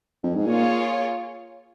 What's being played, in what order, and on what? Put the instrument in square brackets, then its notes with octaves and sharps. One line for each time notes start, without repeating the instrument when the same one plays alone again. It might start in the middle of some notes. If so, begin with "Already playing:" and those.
[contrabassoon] F2
G#2
[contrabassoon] A#2 [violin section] A#3 F4 G#4 C#5